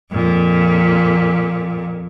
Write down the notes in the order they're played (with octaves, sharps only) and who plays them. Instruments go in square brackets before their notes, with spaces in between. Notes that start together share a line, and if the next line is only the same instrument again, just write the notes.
[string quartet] F2 A#2